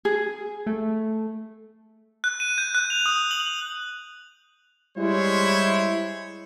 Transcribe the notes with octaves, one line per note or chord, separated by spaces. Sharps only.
G#4
A3
F#6
D#7
G6
F#6
F7
D#6
F#7
G3 G#3 E4 C5 C#5